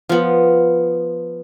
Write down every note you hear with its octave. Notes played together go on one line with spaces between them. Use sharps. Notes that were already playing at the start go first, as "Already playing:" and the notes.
F3 B3